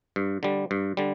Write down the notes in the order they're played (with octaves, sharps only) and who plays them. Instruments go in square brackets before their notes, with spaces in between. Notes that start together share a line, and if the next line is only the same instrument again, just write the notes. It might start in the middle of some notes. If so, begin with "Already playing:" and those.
[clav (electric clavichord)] G2
D3 G3
G2
D3 G3